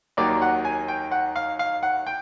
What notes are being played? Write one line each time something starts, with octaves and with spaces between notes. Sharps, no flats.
D#2 D#3 F#3 A#3 D#4 D5
F#5
G#5
G5
F#5
F5
F5
F#5
G5